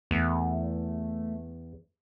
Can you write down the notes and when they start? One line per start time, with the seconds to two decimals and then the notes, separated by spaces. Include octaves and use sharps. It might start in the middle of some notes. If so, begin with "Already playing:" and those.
0.11 E2 A3